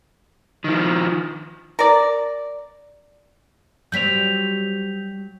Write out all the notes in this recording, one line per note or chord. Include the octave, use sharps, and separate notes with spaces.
D#3 F3
A#4 D5
F#3 G3 C4 G6 B6 F7